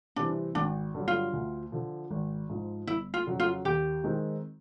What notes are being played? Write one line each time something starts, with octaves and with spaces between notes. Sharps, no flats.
C3 E3 G3 C4 D4
G#1 D4
G2 D3 F#3
F4
D2
D3 F3
G#1
G#2 F3
G1 E4
F4
F2 C#3 F#3
F4
D#2 G4
D#3 G#3 C4 D#4